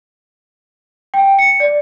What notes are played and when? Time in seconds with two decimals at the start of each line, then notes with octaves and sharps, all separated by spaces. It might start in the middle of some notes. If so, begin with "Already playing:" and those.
1.14 G5
1.39 C#7
1.60 D5